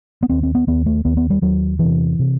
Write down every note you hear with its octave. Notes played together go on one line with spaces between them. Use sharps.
B3
D#2 C4
C4
B3
D#2 B3
A3
D#2 B3
B3
G3
D#2 F#3
E2 C3 E3
C3